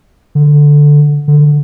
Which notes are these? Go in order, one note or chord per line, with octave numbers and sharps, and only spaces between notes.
D3
D3